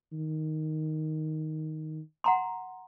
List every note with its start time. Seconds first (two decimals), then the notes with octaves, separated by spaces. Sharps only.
0.12 D#3
2.24 F#5 A#5 C6